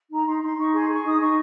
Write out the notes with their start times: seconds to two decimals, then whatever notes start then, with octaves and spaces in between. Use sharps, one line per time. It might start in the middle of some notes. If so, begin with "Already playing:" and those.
0.09 D#4 A#5
0.24 D#4 C6
0.41 D#4 C6
0.56 D#4 C#6
0.72 G#4 C6
0.88 G#4 C#6
1.04 D#4 D#6
1.19 D#4 C#6